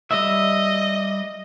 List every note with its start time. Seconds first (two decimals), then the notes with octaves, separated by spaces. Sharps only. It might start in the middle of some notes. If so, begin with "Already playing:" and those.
0.11 G3 D#5 E5